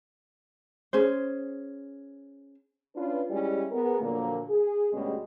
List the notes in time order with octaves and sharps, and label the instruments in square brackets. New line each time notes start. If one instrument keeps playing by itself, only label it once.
[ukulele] C#4 G#4 C5
[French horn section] C#4 D4 F4 B4
G3 G#3 C#4 E4 G4
B3 G#4 A#4
A#2 D3 F3 F#3 A#3
G#4
D2 B2 G3 G#3 C#4